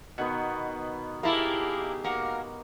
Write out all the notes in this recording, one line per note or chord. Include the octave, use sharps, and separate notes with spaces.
B2 D#3 B3 F#4
A#3 E4 G4 G#4 A#4 A5
A#3 F#4 A#4